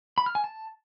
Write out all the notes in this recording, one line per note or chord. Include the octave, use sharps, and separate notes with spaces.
B5
F6
G#5
A5